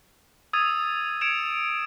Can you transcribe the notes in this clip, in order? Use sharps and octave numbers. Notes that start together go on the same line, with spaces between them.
D#6 E6 G#6 A6 D#7 F7
G#6 C#7 D7 E7 F7